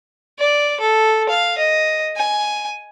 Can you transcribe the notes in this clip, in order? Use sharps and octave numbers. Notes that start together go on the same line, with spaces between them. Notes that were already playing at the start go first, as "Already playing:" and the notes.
D5
A4
F5
D#5
G#5